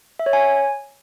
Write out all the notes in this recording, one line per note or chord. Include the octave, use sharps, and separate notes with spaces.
E5
C#5
G#5